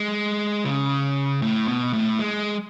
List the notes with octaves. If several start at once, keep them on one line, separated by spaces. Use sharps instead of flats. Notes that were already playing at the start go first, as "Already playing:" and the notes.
Already playing: G#3
C#3
A2
B2
A2
G#3